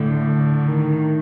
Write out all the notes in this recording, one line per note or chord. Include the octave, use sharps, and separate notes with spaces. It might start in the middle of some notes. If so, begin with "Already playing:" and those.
Already playing: A2 D3
D3
D#3